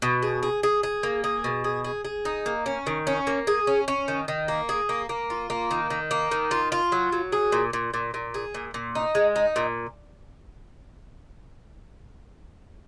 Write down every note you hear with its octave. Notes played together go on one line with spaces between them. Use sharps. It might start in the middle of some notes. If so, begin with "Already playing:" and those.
B2
G#4
G#4
G#4
G#4
A#3
G#4
B2
G#4
G#4
G#4
D#4
A#3
C#4
D#3
C#4
A#3
G#4
C#4
C#4
D#3
D#3
A#3
G#4
A#3
A#3
F4
A#3
D#3
D#3
A#3
D#3
F4
F4
F#3
F#3
G#4
A#2
A#2
A#2
A#2
G#4
A#2
A#2
D#4
G#3
D#4
A#2